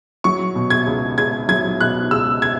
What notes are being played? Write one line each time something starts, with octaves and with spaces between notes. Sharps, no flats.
F#3 C#6
B2
G#6
C#2
C#2 G#6
F#3 G#6
B2 F#6
C#2 E6
G#6